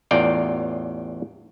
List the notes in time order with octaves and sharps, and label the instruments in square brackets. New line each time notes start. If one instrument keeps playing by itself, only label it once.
[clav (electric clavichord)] A1 E2 F4 D5 G5 A#5